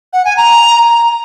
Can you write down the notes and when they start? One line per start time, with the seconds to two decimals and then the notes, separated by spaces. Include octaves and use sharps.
0.13 F#5
0.25 G#5
0.37 A#5